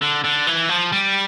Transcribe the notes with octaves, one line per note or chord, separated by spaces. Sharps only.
D3
D3
E3
F3
G3